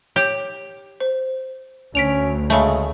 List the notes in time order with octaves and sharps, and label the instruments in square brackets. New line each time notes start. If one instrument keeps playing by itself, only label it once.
[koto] G4 [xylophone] C#5
[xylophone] C5
[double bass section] D2 [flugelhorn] C#4 [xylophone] B6 D7 F7
[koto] C#3 A3 [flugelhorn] G#3